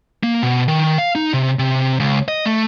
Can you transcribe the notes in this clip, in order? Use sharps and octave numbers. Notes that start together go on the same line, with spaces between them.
A#3
B2
D#3
F5
D#4
C3
C3
C#2
D#5
A3